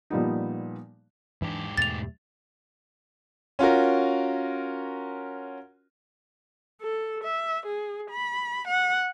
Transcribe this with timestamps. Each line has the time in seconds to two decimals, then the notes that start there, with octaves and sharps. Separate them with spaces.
0.10 A#2 F3 G3 B3 D#4
1.42 G#2 E3 D4 G4
1.78 E2 B2 A3 A6 F7
3.59 C#4 F4 F#4 A#4
6.82 A4
7.24 E5
7.66 G#4
8.10 B5
8.68 F#5